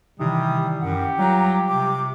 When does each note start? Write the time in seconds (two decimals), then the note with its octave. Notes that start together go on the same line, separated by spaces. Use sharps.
0.20 C3 D#3 E3 G3 D#6
0.81 F#2 G4 F#5
1.19 F#3 G3 F4 A#5
1.69 C3 D6